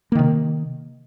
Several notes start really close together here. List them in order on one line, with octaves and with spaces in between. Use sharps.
A#3 D#3 C3